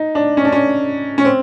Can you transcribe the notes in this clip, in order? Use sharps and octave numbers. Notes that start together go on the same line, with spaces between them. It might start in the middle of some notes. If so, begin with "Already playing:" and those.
Already playing: D#4
D4
C#4
D4
C#4
C#4
C4